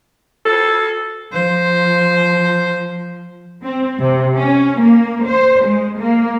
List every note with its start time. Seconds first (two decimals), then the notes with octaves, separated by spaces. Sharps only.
0.46 A4
1.33 F3 C5
3.64 C4
4.00 C3
4.35 C#4
4.81 A#3
5.26 C5
5.65 G#3
5.99 A#3